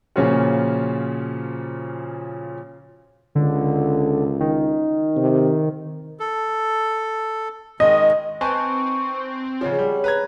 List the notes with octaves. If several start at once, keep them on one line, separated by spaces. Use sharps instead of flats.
A#2 C#3 F3 C#4 F4 F#4
C#2 D3
D#3
C3
A4
D#3 G#3 D#5
C4 D#4 B4 C5 G#5 A5 C#6
C#3 F3 G#3 C#4 F#4 C#5
G3
B4 A#5 G#6